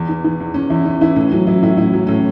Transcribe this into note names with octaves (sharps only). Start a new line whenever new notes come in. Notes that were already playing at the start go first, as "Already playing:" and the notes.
Already playing: E2
E3
E3
E2
E2 C#4
E2 E4
E3 C#4
E3 E4
A2 C#4
F#3 C#4
F#3 E4
A2 E4
A2 E4
F#3
A2 C#4